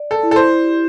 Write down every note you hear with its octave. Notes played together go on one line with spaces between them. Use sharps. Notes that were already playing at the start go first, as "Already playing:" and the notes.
Already playing: D5
A4
E4
A4
C5
G4